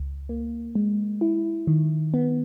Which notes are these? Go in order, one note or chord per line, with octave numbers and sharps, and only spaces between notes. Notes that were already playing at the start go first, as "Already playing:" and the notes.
Already playing: C#2
A#3
G#3
E4
D#3
B3